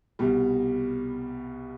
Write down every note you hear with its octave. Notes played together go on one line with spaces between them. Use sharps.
C2 B2 G3